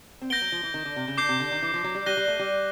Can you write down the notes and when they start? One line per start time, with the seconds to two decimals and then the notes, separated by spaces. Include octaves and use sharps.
0.21 C4
0.30 B3 G6 A#6 D7 G7
0.41 F#3
0.52 F3
0.63 E3
0.74 D#3
0.85 D3
0.96 C3
1.08 C#3
1.18 D3 D6 G6 C7
1.29 C3
1.40 D3
1.51 D#3
1.62 E3
1.74 F3
1.84 F#3
1.95 G3
2.06 G3 F#6 A#6 D#7 G7
2.17 G3
2.28 A3
2.39 G3